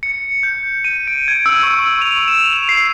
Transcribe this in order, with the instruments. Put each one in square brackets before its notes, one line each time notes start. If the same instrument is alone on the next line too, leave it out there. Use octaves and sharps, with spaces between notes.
[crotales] C#7
G6
D#7
D7
G#6
E6
C#6
F7
E7
F7
C7